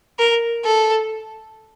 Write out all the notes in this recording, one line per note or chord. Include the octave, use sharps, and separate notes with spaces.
A#4
A4